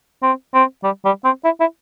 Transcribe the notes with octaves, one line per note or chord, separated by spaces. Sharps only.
C4
C4
G3
G3
C4
E4
E4